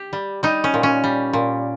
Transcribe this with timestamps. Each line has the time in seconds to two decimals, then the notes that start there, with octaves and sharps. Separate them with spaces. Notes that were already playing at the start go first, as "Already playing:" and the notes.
Already playing: G4
0.13 G3
0.43 G3 D#4
0.64 C#4
0.74 A#2
0.83 C#4
1.04 G3
1.33 A#2